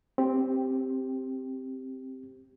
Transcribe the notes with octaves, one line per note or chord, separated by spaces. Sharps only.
C4 G4